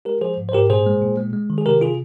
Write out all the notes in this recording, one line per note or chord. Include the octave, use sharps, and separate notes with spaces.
G#3 G4 A#4
F3 G#4 C5
G#2
C5
G#2 G4 A#4
A#2 G#4 C5
G#3
A#2
G#3
G#3
D#3
G#4
C3 G4 A#4
C3 F4 G#4